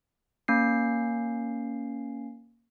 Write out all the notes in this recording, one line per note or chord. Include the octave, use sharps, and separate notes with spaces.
A#3 C#4 C7